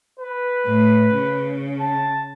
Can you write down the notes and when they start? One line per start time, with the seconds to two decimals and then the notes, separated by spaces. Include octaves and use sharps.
0.20 B4
0.66 A2
1.14 C#3
1.80 A5